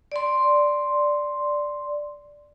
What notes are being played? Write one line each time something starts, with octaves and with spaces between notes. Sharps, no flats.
D5 C6